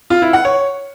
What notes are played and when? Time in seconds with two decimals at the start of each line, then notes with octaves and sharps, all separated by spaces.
0.10 F4
0.22 E4
0.33 F#5
0.45 C#5